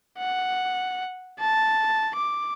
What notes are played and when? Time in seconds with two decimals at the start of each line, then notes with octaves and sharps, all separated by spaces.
0.19 F#5
1.40 A5
2.15 D6